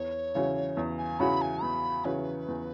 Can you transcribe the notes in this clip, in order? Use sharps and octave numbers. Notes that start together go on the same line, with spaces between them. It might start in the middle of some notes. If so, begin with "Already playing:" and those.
Already playing: E2 C#5
C#3 E3 C#4 F#4
E2
G#5
C#3 E3 C#4 F#4 B5
G#5
E2 B5
C#3 E3 C#4 F#4 B4
E2